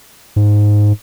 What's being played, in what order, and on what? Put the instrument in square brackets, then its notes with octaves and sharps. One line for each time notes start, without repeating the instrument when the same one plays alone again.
[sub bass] G#2